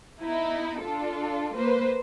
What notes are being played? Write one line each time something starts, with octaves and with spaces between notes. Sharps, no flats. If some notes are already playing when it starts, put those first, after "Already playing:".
B3 D#4 E4
D4 F4 A4
A#3 B4 C5